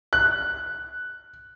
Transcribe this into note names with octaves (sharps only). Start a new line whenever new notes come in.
F#6